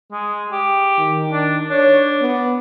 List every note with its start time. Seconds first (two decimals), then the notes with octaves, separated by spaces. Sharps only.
0.12 G#3
0.52 G4
0.99 D#3
1.32 D4
1.70 D4 C#5
2.22 B3